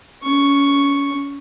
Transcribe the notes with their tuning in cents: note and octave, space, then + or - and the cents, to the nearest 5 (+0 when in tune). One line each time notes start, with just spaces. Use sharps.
C#4 +30 C#6 +0